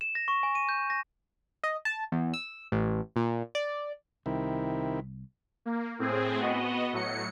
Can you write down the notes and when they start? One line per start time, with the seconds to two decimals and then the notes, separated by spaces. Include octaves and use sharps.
0.01 E7
0.15 A#6
0.28 C#6
0.43 G#5
0.55 D#7
0.69 G6
0.90 A#6
1.64 D#5
1.85 A5
2.12 E2
2.34 E6
2.72 A1
3.16 A#2
3.55 D5
4.26 C2 C3 D#3 E4
5.65 A#3
5.99 A2 C4 G#4
6.39 B3 F#4 D#5
6.93 A2 F#3 C#7